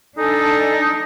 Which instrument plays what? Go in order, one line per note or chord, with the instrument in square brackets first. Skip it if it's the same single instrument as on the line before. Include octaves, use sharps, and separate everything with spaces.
[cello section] D4 [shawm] D#4 [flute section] A4 D#5 G#5